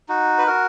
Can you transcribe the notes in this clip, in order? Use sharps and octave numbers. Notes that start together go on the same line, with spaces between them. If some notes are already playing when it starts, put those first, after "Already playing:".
D#4 F#4
B4
F#4 A#4